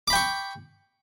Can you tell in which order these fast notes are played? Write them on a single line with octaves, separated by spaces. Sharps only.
D6 B5 G5 C#6